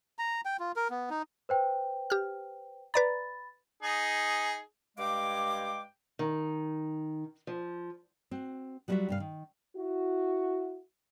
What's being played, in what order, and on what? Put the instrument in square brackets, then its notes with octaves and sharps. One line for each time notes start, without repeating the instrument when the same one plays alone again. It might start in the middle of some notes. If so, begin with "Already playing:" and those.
[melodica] A#5
G5
F4
A#4
B3
D#4
[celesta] B4 C5 G5
[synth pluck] G4 F6
[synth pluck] B4 D5 A#5 [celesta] B5 A6
[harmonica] D#4 G#4
[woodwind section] G2 G#3 F5 G5 D6
[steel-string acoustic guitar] D#3
F3
[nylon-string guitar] C4 F#4
F#3 G3 D#4 F4 F#4 E5
G2 C3 F5
D#3
[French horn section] E4 F#4